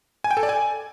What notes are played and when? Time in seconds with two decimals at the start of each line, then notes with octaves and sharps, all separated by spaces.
0.24 G#5
0.31 G5
0.37 A4
0.43 D5
0.49 G#5